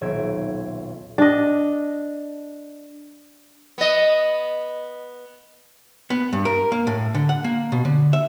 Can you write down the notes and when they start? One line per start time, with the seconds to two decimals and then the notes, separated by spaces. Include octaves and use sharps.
0.01 D#1 B1 E5 G#6 D7
1.18 D4 D#5
3.78 B3 D#5
6.10 B3
6.33 G2
6.45 A#4
6.72 A#3
6.87 A2
7.15 D3
7.29 F#5
7.44 A#3
7.72 B2
7.85 D3
8.13 E5